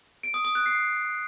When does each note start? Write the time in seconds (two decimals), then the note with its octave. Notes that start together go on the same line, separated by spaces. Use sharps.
0.23 D7
0.34 D#6
0.45 D#6
0.55 F#6
0.66 C7